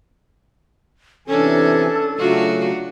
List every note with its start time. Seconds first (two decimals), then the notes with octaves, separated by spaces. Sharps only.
1.28 C3 E3 C#4 D4 A4 G#5
2.18 C#3 F#3 A3 D4 F4 F#4